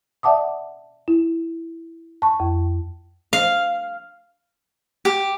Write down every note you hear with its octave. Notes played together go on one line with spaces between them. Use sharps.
D5 E5 F#5 A5 D6 D#6
E4
A5 C#6
F2
F5
G4